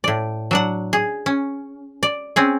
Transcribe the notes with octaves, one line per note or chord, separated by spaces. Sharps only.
A2 D5
F#3 D4 F#5
G#4
C#4
D5
C4 C#4 G#4